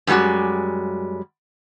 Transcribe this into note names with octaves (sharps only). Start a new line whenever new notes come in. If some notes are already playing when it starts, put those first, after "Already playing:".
F#2 C#3 G3 G#3 F#4